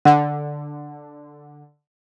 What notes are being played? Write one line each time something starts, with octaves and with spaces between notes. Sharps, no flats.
D3 F#5